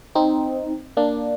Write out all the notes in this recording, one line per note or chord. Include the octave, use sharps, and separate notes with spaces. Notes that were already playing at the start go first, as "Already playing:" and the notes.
C4 D#4
A#3 D4